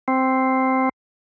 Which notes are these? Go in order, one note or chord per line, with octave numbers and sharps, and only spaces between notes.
C4